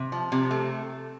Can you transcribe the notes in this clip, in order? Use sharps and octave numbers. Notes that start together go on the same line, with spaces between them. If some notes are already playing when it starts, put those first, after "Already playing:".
Already playing: C3
F3
C3
A3